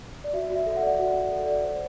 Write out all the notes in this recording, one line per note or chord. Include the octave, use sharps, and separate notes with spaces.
D5
F#4 E5
F#4
E5
A4
E5
F#5
D5
F#4 F#5
F#4
A4
D5
C5